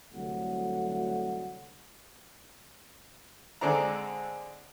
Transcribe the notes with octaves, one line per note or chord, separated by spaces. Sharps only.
C2 D3 F#3 A3 F#5
D3 G#3 C4 D4 A#5